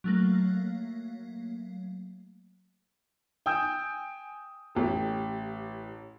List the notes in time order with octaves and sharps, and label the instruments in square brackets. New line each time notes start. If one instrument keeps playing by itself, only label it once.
[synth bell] F#3 A3 A#3
[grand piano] G5 G#5 D#6 E6 G6
A1 G4 A4